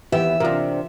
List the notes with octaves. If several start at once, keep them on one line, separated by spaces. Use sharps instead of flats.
D#2 E3 B3 G4 E5
C3 D4 F4 A#4